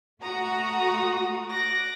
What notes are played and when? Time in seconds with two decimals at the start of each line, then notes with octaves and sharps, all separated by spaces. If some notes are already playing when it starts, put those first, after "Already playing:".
0.23 A3 F#4 F#5 A#5 D#6
1.49 D6 F#6 A#6